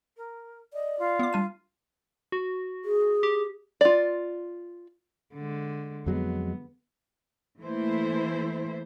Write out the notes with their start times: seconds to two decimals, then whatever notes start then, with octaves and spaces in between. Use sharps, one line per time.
0.16 A#4
0.73 D5 D#5
0.99 F4
1.19 B3 D6
1.33 G3 D4 D#7
2.32 F#4
2.85 G#4
3.23 G4
3.81 F4 D5
5.35 D3 G#3
6.06 F2 F#3 G#3 B3
7.60 E3 A3 A#3 E4 C5